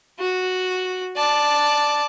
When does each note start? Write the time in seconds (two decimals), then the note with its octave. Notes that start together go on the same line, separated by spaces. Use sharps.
0.19 F#4
1.16 D5 A5